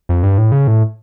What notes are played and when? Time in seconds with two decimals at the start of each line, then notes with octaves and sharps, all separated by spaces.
0.09 F2
0.23 G2
0.38 A2
0.52 C#3
0.67 A2